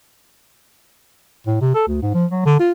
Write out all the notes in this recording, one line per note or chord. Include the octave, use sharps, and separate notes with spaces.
A2
C3
A4
D2
G#2
F3
F#3
D3
F4